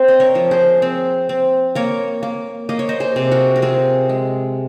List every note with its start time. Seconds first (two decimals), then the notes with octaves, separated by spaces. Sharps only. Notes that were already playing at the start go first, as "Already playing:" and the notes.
Already playing: C4 C5
0.08 D#5
0.20 A#4 C#5
0.35 F3
0.51 G#4 C5
0.82 C4
1.29 C4
1.75 A#3 A#4 C#5
2.23 A#3
2.69 A#3 D#5
2.79 C#5
2.89 C5 D#5
3.00 G#4 C5
3.16 C3
3.32 F#4 A#4
3.56 A#4
3.62 C4 F4 G#4
4.09 G#3